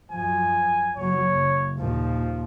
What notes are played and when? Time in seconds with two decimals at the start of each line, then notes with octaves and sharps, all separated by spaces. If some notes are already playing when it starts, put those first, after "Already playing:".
0.11 F#2 F3 G#5
0.97 F#1 F#3 C#5
1.31 F#1
1.78 D#2 A#2 F3